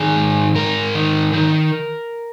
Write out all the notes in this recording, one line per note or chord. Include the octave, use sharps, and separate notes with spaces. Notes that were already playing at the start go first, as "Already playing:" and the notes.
Already playing: D#3 G#4
G#2
G#2 A#4
D#3
D#3